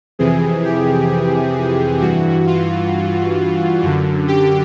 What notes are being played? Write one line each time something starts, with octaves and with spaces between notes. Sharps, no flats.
F2 C3 E3 G#4
G4
G2 E3 F#4
F4
F#2 D3
G4